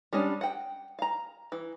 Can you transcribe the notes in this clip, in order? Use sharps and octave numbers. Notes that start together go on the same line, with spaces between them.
G3 G#3 C#4 D4
F#5 G5
F5 A#5
E3